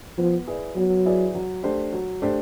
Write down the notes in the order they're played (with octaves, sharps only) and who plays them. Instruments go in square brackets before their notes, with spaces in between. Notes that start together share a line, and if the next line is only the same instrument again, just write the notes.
[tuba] F3 [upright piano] B3
[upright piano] E4 G#4 B4 D5
[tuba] F#3 [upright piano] B3
[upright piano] E4 G#4 B4 D5
F#3
A3 D4 G4 C5
F#3
A3 D4 G4 C5